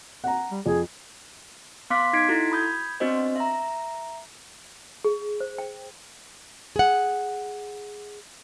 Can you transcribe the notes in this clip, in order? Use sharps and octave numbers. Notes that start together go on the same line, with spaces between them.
F#5 A#5
G3
F2 G#4
B3 F5 C6 D6 F#6 B6
D#4 G#6 B6 C7 D7
E4 F#4 A4
B5 D#6 G6 G#6
B3 C4 D4 F#4 C5 D#5
E5 A#5
G#4
C5
G5
G#4 F#5